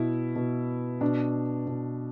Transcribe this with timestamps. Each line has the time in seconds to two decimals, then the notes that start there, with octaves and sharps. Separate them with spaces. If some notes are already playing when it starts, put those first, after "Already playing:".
Already playing: B2 E4
0.36 B2
1.01 B2 D4
1.67 B2